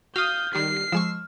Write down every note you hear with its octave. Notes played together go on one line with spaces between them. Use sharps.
F#4 F5 D#6 F6 G6
D#3 G3 C7
F3 G#3 C#6 E6